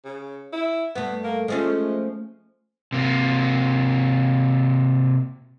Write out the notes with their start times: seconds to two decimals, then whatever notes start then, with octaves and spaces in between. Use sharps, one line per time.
0.05 C#3
0.53 E4
0.95 G2 A3 B3
1.24 A#3
1.48 F3 G#3 A3 C#4
2.92 C3 A#3